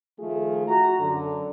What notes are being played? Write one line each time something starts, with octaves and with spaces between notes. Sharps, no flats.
D#3 F3 A3 F4 G#4
F#4 A#5
F#2 D3